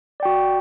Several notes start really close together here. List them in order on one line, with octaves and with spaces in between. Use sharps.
D5 G5 F#4